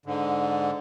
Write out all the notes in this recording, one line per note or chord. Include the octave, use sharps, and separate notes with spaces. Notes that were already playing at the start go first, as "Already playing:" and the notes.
G#2 D3